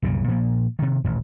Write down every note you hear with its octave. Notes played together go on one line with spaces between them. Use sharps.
C2 F#2 A#2 C#3
A#2 F3 A#3
C3 D#3
D#1 A1 E2